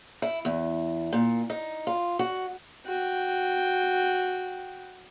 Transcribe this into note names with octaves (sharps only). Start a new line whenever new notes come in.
E4
E2
A#2
D#4
F4
F#4
F#4 G5